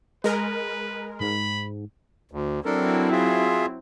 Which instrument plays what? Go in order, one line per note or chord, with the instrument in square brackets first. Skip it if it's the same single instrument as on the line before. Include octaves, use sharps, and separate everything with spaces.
[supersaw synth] G#3 A#4 [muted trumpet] B4
[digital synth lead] G#2 [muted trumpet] B5
[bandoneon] D2
[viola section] F#3 C4 E4 [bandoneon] D4 A4 A#4
[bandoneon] F4 G#4 E5